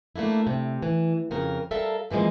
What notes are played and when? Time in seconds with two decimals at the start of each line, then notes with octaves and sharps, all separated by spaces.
0.16 A3 A#3 D4 E4
0.47 C3
0.83 E3
1.31 F2 C#3 A#4
1.71 G3 A4 A#4 E5 F5
2.10 C3 E3 F3 G#3 A#3